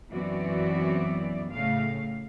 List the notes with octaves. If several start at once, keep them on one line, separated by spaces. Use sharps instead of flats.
F#2 E3 B3 C4 F#4 D5
A2 C#3 A3 F5